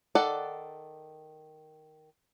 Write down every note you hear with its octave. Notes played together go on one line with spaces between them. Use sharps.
D#3 A4 D5 F#5